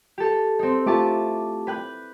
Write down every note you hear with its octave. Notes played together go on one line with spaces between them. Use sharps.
G4 A4
C4 D#4
A3 E4 F4 G4 A5 D6
B4 G5 F#6